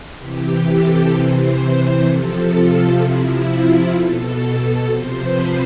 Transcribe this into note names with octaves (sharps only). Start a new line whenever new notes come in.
C3 E3 G4
A4
C3 E3 C5
C5
C3 F3 A4
F4
C3 F3 E4
F4
B2 A4
C3 F3 C5
B4